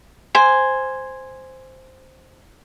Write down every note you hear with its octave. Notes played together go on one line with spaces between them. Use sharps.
C5 G#5